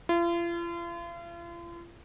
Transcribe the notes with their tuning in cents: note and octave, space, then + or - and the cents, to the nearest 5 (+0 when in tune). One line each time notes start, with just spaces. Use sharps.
F4 -40